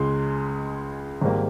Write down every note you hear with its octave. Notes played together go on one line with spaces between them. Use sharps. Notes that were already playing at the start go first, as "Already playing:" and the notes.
Already playing: C#2 C#3 G#3 C6
G#1 G#2 G3 A#3